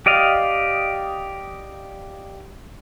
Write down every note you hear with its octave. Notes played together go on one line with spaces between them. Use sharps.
G4 D5 D#5 F5